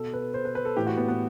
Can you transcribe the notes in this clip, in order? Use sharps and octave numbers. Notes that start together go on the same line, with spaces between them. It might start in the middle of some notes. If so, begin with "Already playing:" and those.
Already playing: B2 A4
B4
C5
B4
B4
A4
A2 E3 G4
F#4
B3
B3